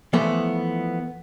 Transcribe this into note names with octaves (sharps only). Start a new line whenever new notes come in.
E3 F3 A3 B3